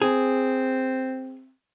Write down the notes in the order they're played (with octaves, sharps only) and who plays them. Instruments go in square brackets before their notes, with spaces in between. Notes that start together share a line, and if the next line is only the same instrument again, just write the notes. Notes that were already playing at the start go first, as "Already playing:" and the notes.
[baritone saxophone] C4 [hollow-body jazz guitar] G#4